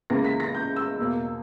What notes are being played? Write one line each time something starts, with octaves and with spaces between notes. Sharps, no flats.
C#2 C#3 E3 A#3 A#6
B6
A#6
G6
E6
E2 B2 A#3